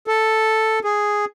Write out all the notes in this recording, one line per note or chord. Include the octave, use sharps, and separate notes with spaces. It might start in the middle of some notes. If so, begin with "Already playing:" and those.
A4
G#4